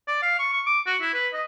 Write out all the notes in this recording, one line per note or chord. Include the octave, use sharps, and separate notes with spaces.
D5
F5
C#6
C#6
D6
F#4
E4
B4
D#5